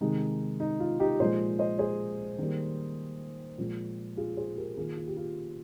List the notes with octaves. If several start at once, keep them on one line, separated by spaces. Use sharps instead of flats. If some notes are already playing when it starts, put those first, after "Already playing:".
C3 D#3 G#3 D#4
D#4
F4
D#4 G4
A#2 F3 G#3 C5 D#5
C5 D#5
G#4 C5
D#3 G3 A#3
A#2 F3 G#3
F4 G#4
G#4 C5
G4 A#4
D#3 A#3 F4 G#4
F4
G4
F4